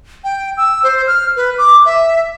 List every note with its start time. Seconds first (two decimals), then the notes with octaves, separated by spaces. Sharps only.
0.24 G5
0.57 E6
0.83 C5
1.07 F6
1.36 B4
1.58 D6
1.86 E5